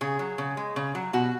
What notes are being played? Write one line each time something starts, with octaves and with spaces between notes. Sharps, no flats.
C#3 G#4
F#3
C#3
G#3
C#3
F#3
B2 F#4